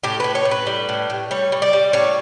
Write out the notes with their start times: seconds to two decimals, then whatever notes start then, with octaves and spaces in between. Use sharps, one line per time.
0.03 A2 G4
0.20 A2 B4
0.35 C#5
0.45 A2
0.51 B4
0.66 G3
0.89 A2
1.10 A2
1.31 G3 C#5
1.52 G3
1.62 D5
1.73 G3
1.93 A2 C#5